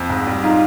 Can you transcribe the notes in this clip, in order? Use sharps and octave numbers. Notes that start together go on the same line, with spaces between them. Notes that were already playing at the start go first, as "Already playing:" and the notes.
Already playing: F2
G#2
G3
D#4 F4